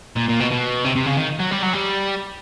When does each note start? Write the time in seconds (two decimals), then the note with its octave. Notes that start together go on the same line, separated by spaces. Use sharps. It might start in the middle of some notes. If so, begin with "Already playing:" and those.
0.16 A#2
0.28 A#2
0.40 B2
0.51 B2
0.84 C3
0.96 C3
1.06 C#3
1.17 D#3
1.40 F#3
1.51 G3
1.63 F#3
1.73 G3